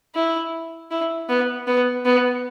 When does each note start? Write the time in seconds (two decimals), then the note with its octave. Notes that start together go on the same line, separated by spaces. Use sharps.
0.15 E4
0.91 E4
1.29 B3
1.67 B3
2.05 B3